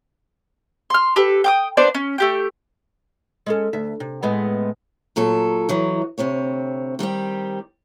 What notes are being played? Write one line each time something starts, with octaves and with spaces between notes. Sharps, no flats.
C6 F6
G4 A4 B4
G5 D6 D#6
B3 D4 C5 D5
C#4
A3 G4 G5
G#3 C#4 A4
D2 E5
C3
A2 G#3 B3
A#2 F#3 A4
E3 F#3 D#4
D2 C3 C4 C#5
D#3 G3 C4 G4